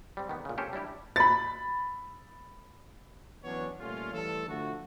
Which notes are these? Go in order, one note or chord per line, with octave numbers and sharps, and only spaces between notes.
G3 C4
D#3 B3
A#2 C#3
C4 C#4 G4 A4 A#4 C5
G3 D4 E4 G4
B5 A6
E3 F#3 B3 C#4 D4 C#5
A#2 G3 A3 C#4 F4
E3 G3 A3 A4
D3 F3 A3 F#4